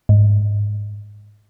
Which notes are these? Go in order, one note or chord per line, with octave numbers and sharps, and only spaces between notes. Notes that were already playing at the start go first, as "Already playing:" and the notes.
G#2